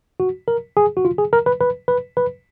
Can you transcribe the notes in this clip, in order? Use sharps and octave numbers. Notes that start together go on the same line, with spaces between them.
F#4
A#4
G#4
F#4
F4
G#4
A#4
B4
B4
B4
B4